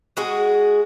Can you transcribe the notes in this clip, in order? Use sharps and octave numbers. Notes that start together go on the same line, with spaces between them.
G#3 F#4 G#4